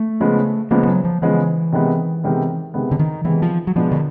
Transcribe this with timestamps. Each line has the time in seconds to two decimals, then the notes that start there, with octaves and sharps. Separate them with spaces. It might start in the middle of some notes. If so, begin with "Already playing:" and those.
Already playing: A3
0.20 C#3 F3 G#3 B3
0.71 C#3 F3 G#3 A#3 B3
0.83 G3
0.87 F#3
1.04 F3
1.22 C#3 E3 F3 G#3 B3
1.72 C3 D#3 G#3 B3
2.23 C3 D#3 G#3 B3
2.74 C3 D#3 G#3 B3
2.91 D3
2.99 D#3
3.25 C3 D#3 E3 G#3 B3
3.42 F3
3.67 F#3
3.75 B2 F3 G#3 B3 D4 F#4
3.92 D3